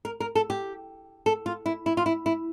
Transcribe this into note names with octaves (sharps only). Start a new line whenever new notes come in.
A#4
A#4
A4
G4
A4
F4
E4
E4
F4
E4
E4